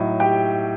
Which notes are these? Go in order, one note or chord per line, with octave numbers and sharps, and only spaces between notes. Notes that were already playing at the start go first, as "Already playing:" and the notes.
Already playing: A2 F#3 D#4
G4 G5